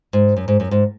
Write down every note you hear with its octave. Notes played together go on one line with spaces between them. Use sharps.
G#2
F#2
G#2
F#2
G#2